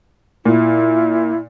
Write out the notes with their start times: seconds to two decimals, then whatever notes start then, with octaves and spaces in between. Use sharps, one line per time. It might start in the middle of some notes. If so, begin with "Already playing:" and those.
0.45 A#2 E4